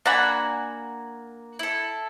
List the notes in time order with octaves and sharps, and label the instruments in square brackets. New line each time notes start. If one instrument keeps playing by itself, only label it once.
[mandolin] A#3 F#4 G#5 [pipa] D4 F#5 B5
[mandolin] E4 A4